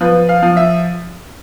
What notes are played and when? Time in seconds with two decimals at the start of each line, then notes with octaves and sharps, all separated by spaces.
0.01 F3 B4
0.29 F5
0.43 F3
0.57 E5